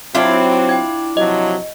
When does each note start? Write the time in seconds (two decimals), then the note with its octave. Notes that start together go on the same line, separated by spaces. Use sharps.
0.15 F#3 C4 D4 E4 F4
0.69 G5 G#6
1.17 C3 F3 F#3 D#5